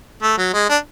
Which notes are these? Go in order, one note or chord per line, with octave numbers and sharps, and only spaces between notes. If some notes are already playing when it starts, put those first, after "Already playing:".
A3
F#3
G#3
D4